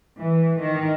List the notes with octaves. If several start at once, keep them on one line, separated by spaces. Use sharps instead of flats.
E3
D#3